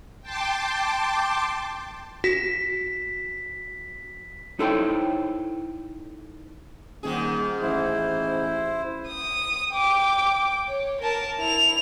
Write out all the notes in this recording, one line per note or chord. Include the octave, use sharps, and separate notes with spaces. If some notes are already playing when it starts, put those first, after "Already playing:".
G5 A5 C6 D6
F#4 B6
D#4 E4 A4 C5 C#5 G5
D#1 G#2 D#3 G#4
A1 E4 C5
D#6
G5 D6
C#5
A#4 A5
E4 F7